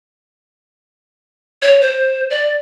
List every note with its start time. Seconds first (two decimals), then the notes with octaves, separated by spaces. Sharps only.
1.62 C#5
1.81 C5
2.30 D5